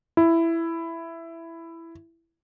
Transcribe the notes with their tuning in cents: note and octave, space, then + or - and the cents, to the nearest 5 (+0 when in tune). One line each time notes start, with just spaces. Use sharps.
E4 +10